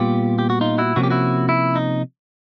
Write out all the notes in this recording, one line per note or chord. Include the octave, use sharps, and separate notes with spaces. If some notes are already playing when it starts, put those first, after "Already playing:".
Already playing: A#2 G3 B3 F4 G4
G4
F#4
D#4 F4
E4 F#4
C3 F3 A#3 C#4 F#4
G4
E4 F#4
E4
D#4